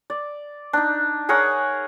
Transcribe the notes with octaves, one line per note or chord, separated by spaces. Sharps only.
D5
D4 D#4
G#4 A#4 C#5 F#5